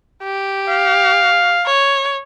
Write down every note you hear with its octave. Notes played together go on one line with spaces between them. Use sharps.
G4
F5
C#5